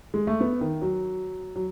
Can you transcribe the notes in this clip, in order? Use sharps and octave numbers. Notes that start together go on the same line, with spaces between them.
G#3
A3
B3
D#3
F#3
F#3